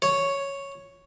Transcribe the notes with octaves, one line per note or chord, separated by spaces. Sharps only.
C#5